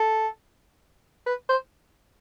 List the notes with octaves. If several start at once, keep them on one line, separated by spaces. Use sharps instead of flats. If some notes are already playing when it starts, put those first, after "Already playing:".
Already playing: A4
B4
C5